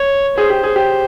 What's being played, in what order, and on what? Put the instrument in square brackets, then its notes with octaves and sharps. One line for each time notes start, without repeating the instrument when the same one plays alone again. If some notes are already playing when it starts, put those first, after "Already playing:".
Already playing: [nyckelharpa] C#5
[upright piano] G#4 [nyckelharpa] C5
[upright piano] G4
G#4
G4